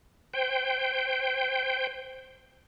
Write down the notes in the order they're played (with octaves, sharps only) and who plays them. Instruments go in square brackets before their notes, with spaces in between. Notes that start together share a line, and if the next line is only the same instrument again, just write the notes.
[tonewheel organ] C5 G5